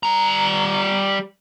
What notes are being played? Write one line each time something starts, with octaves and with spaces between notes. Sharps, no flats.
G3 A#5